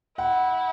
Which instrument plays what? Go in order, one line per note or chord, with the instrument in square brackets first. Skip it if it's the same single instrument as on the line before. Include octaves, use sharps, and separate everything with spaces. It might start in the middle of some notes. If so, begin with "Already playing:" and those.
[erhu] E4 [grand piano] F#5